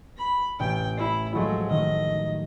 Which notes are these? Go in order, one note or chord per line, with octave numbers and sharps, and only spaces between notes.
B5
A1 G5 D7
E4 C7
F3 F#3 G#3 A3
D#3 A3 D#5